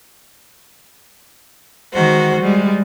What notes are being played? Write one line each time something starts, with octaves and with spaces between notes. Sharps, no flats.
D#3 G#3 F#4 C5
G3 G#3